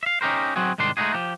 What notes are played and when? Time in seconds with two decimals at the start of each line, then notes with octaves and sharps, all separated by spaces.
0.03 E5 F5
0.21 C#4 D#4 G4 A#4 C5
0.56 F#3 C4 F#4 G#4
0.78 C2 G#2 D#3 D4 C6
0.97 G#3 A3 C#4 D#4 F#4 G#4
1.14 F3 G4